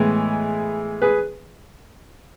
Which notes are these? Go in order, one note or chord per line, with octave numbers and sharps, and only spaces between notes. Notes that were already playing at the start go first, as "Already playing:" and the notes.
Already playing: A2 E3 G#3 B3
G#4 B4